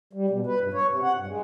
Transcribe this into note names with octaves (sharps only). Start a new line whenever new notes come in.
G3
B2
B4
G2
C#5
C3
F#5
G2
G#3